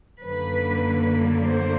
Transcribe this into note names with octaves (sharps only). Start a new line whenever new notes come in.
F#2 D3 F#3 A#3 B4
C5